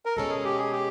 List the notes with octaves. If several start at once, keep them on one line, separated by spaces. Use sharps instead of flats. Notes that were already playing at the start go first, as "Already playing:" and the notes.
A#4
B2 G#3 C#4 A4
G#4
G4
G#4
G4